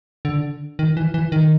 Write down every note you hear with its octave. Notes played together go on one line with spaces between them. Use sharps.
D3
D#3
E3
E3
D#3